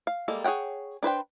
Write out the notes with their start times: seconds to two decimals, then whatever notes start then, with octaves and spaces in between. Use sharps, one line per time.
0.07 F5
0.28 G3 G#3 A#3 A4
0.44 G#4 C#5 F#5 G5
1.03 D4 B4 C5 G5